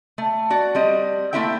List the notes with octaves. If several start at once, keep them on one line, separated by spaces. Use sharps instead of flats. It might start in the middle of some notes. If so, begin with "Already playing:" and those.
A3
F#4 D5
G3 C4 D#5
A3 A#3 C4 E4 E5 G5